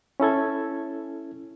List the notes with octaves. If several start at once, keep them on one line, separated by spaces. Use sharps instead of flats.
C#4 E4 A4 G#6